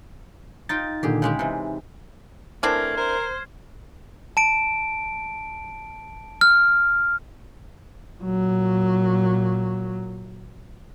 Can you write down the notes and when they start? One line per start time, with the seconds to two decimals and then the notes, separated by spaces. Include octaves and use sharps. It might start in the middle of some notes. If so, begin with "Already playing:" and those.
0.69 D#4 F4 G5 A6
1.03 A#2 D3 D#3 G4 G#4
1.22 C#3 G#3 G4
1.39 C3 E3 D#4
2.63 E3 A3 C4 D4 A#4 F6 G#6 C7
2.98 A#4 C5
4.37 A5 D7
6.41 F6
8.23 A#2 F#3